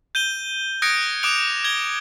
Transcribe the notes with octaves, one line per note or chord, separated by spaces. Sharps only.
G6 D#7 G7
D#6 F#6 G#6 A#6 C#7 D7
D6 D#6 F#6 D7 F7
G#6 G7